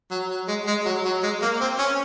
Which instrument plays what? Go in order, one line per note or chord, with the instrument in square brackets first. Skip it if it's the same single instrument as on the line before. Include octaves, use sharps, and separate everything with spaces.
[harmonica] F#3
F#3
G#3
G#3
F#3
F#3
G#3
A#3
C4
C#4